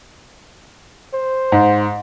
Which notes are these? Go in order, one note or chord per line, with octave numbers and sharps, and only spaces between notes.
C5
G#2